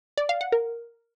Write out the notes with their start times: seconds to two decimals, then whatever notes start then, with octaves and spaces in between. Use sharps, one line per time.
0.17 D5
0.29 F5
0.41 F#5
0.52 A#4